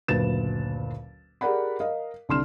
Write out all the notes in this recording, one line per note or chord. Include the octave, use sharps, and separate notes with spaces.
F#1 D2 A#2 B4 A6 E7
G4 G#4 A#4 D5 F#5 B5
A#4 D#5 F5
C2 D3 D4 C6 F6 E7